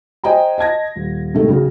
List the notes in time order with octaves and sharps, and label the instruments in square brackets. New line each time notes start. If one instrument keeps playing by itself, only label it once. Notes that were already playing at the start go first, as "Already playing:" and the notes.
[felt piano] C5 D#5 G5 G#5 A#5
D#5 A5 G#6 A#6
D#1
G#2 C3 D#3 A3
B1 C#3